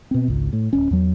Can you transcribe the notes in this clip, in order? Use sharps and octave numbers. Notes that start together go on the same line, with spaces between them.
B2 C4
G#1 C#2
A2
D1 G1 C#4
E2 F#3